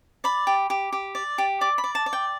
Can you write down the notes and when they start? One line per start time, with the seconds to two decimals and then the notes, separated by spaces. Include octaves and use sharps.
0.24 D5 B5
0.47 G4
0.70 G4
0.92 G4
1.15 D5
1.38 G4
1.61 D5 D6
1.78 B5
1.84 D5
1.95 A5
2.06 D5
2.13 G5